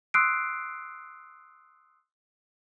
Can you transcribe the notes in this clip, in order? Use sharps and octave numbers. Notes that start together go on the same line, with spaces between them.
C6 D#6 E6 F#6 C7 D7